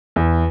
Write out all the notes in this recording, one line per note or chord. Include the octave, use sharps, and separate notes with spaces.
E2